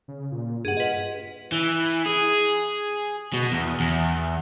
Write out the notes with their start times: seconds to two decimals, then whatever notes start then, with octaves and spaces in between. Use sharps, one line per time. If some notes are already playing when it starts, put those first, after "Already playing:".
0.08 C#3
0.32 A#2
0.65 G2 G#4 F#5
0.77 F4 B4 D#5
1.52 E3
2.06 G#4
3.34 B2
3.52 E2
3.80 E2